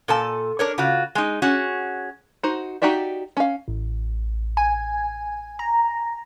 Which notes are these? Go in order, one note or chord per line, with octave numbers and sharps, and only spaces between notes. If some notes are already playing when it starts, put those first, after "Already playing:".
A#2 A4 G#5 A5
D4 A#4 C#5
C#3 F4 F#4
G#3 D#4
C#4 F#4 G#4
D#4 F#4 C5
D#4 F#4 G4 D5 E5
C#4 F5
A1
G#5
A#5